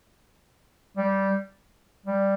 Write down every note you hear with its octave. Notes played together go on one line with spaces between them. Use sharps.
G3
G3